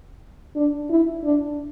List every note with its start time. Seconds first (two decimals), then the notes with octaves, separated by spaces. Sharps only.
0.56 D4
0.90 E4
1.24 D4